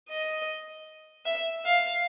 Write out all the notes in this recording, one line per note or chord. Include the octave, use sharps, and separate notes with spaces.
D#5
E5
F5